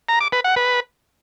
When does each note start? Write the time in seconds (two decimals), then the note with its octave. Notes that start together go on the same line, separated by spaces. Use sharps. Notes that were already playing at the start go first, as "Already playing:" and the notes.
0.09 A#5
0.21 D6
0.32 B4
0.44 F#5
0.56 B4